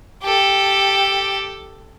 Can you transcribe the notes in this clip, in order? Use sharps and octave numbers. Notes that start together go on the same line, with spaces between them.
G4 A4